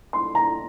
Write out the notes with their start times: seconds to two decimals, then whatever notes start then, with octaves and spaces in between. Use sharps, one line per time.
0.13 C6
0.35 A#5